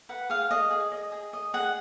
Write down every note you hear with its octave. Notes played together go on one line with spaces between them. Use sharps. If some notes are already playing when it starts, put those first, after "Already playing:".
B4 F#5
G#4 F5
G#4 D#5
G#4
D#5
G#4
D#5
G#4 F#5